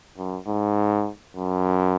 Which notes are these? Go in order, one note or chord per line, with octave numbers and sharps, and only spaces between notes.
F#2
G#2
F#2